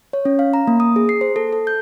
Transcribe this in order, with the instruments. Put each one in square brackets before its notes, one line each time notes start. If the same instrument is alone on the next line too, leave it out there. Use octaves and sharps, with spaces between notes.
[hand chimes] C#5
C#4
F5
A#5
A#3
D#6
G#4
C7
C5
A4
A4
G6